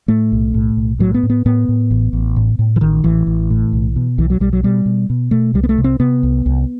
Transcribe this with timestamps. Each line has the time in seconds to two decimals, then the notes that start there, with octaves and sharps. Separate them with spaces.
0.08 A2 A3
0.32 B1
0.54 A2
0.77 B1
0.99 A2 F#3
1.14 B3
1.23 A2
1.30 B3
1.46 A2 B3
1.69 A2
1.91 A1
2.13 A1
2.36 A2
2.59 A2
2.76 E3
2.81 A1 D#3
3.04 A1 E3
3.27 A1
3.50 A2
3.73 B1
3.96 B2
4.18 B1 E3
4.30 F#3
4.40 B1 G3
4.53 F#3
4.63 B2 G3
4.86 B2
5.10 B2
5.31 B2 A3
5.54 C2 G3
5.63 B3
5.69 A3
5.78 C3
5.84 C4
6.00 C3 B3
6.23 C2
6.46 C2